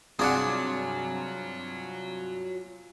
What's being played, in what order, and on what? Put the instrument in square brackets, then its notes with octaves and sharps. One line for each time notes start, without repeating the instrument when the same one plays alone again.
[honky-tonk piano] G2 C3 [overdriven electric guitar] F#3 [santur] F4 G#5 [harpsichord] G#4 D5 F#5